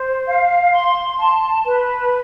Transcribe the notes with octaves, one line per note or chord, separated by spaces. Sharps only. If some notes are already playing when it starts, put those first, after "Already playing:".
Already playing: C5
F5
C6
A5
B4